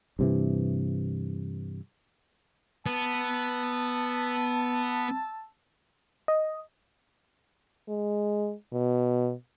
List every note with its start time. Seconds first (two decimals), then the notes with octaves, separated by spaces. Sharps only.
0.19 G2 C3 E3
2.86 B3 A5 E6
6.28 D#5
7.88 G#3
8.73 B2